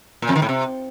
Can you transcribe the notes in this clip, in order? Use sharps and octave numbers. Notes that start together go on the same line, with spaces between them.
A#2
F2
D#3
A2
C3